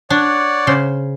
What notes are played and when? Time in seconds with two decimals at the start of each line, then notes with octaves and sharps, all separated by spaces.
0.10 D4 C#5 D5 F#5
0.67 C#3 C5